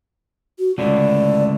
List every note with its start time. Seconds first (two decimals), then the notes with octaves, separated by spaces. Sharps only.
0.59 F#4
0.78 C#2 A2 D3 D5